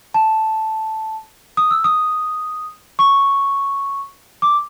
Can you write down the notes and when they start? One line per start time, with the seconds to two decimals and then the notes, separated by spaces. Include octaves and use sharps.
0.14 A5
1.57 D#6
1.71 E6
1.84 D#6
2.99 C#6
4.42 D6